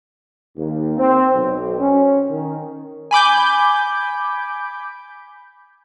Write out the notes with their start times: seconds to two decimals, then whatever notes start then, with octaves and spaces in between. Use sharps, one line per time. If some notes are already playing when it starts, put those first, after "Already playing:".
0.56 D#2
0.98 C4
1.34 B1
1.79 C#4
2.30 D#3
3.11 G#5 B5 D6 G6